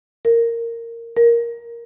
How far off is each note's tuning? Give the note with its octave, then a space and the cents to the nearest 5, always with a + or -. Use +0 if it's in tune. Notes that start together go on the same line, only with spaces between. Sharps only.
A#4 -15
A#4 +5